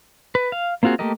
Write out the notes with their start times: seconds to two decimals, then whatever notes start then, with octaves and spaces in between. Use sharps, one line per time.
0.35 B4
0.52 F5
0.83 A#3 C4 F4 F#4 G#4
0.99 A3 A#3 G4 A#4 D#5